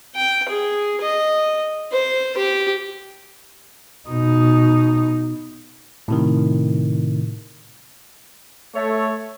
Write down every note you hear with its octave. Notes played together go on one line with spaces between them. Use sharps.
G5
G#4
D#5
C5
G4
B2 D#4
A2 C3 D#3
A3 C#5